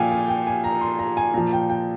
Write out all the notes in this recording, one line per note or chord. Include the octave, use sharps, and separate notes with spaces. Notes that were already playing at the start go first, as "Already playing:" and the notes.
Already playing: A#2 F3 F5 G5 G#5
G#5
G5
G#5
A#5
C6
A#5
G#5
A#2 F3 A#5
G5
G5